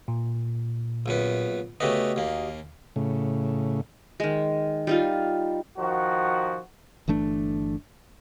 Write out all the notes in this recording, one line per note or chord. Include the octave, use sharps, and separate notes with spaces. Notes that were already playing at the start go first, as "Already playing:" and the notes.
A#2
A#1 F#2 B3
C#3 A3 B3 F#4 G4 D#5
D#2 A#3
A2 C#3
D#3 G#3
G3 D#4 F4
D#3 F3 F#4
G1 E3 A3 D4